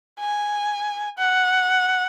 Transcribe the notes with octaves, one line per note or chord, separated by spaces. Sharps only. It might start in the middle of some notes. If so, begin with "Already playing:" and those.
G#5
F#5